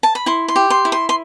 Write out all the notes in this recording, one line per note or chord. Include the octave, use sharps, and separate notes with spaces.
A5
B5
E4 C6
C6
G4
C6
E4
C6
C6